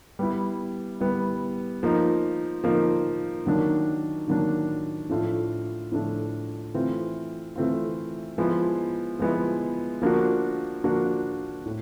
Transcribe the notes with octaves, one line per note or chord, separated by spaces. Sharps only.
G3 B3 E4
G3 B3 E4
F3 A#3 D#4
F3 A#3 D#4
D#3 F#3 A#3 D4
D#3 F#3 A#3 D4
A2 F3 A3 D4 F4
A2 F3 A3 D4 F4
E3 A3 C4 F4
E3 A3 C4 F4
F3 G#3 B3 E4
F3 G#3 B3 E4
F3 A#3 D4 F#4
F3 A#3 D4 F#4
A2